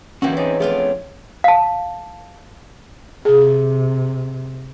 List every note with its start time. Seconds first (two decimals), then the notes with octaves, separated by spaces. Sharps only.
0.22 E2 D3 E3 A#3 C#4 E4 F#4 G5
0.37 C4 D#4 G#4 C#5 D5
0.60 F2 A3 B3 D4 F4 G#4 B4 D5
0.78 C#5
1.44 F5 A5
3.25 C3 G#4